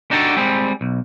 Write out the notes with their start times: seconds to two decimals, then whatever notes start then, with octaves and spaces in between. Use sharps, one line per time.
0.11 D4 D#4 F#4 G4 A4 D5
0.36 G3 G#3 C4
0.81 B1